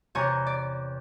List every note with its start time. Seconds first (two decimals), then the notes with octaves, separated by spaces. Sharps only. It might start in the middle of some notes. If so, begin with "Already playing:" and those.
0.15 E2 C3 C#5 G#5 A#5 C#6
0.47 D5